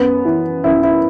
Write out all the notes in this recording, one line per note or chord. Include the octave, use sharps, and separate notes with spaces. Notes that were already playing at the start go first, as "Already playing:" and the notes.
Already playing: F#2 B3
E3
F#2 E4
E4